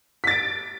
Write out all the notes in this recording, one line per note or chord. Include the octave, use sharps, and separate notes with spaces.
A6 B6 D7